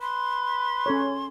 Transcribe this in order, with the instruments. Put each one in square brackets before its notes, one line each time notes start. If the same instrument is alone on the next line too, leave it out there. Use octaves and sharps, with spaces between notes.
[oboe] B4 [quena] C6
[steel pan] C#4 A4 C#5